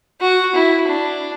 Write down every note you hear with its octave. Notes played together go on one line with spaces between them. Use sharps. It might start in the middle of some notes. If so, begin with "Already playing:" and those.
F#4
E4
D4